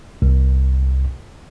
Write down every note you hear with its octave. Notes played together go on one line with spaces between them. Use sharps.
C2